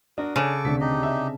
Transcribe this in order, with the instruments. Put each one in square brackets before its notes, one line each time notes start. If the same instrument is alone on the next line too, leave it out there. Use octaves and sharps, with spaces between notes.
[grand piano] D4 [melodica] F#4 A#4 D#6
[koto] C#3 [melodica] A4 C#6 D6
[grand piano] D2 B6 [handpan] C3 D4
[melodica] D#4 G4 D#5
[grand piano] E5